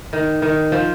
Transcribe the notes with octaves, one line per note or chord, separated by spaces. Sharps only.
D#3
D#3
F3